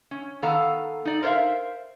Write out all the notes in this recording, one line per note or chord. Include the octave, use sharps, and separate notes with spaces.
C#4
D#3 B3 A4 F5 A#5
D#4 D5
A#4 C5 C#5 E5 F5